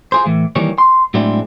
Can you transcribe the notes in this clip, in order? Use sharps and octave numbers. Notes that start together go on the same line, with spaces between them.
F4 G#4 C5
A2 E3
D#3 E3 G3 A#3 C#5
C6
A2 F#3 G#3 C4 D4 E4